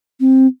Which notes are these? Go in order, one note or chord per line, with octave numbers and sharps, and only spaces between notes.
C4